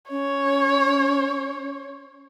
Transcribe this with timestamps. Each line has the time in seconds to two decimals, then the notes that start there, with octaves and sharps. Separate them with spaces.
0.10 C#4 C#5